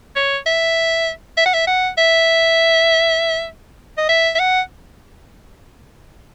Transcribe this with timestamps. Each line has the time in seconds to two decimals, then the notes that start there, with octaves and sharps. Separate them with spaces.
0.16 C#5
0.47 E5
1.37 E5
1.46 F#5
1.54 E5
1.68 F#5
1.98 E5
3.98 D#5
4.09 E5
4.35 E5
4.40 F#5